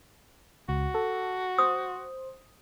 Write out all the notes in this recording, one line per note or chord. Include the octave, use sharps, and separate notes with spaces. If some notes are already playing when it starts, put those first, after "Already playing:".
C#2 F#4
A4
C5 D#6